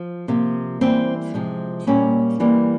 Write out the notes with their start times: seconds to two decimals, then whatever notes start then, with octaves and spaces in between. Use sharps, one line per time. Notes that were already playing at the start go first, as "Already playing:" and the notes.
Already playing: F3
0.28 C3 F3 A#3
0.81 E3 G3 A#3 C4
1.34 C3 F3 G#3
1.87 A#2 G3 A#3 C#4
2.40 E3 G3 A#3